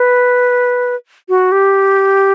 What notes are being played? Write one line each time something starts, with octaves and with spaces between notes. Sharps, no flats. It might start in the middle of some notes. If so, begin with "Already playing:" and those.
Already playing: B4
F#4
G4